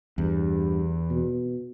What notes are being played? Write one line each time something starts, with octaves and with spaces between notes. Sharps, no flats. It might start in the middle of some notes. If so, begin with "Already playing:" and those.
E2 G2
B2